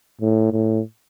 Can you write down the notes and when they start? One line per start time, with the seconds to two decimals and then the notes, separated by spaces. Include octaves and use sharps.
0.21 A2
0.52 A2